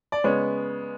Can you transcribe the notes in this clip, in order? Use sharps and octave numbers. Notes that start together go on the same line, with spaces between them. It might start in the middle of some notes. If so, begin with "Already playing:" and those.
D5
C#3 G#3 B3 C#5